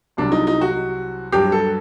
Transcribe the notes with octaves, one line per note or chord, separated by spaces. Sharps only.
C2 C3 F#3 D4
D#4
D#4
F#4
G2 F#3 G4
A4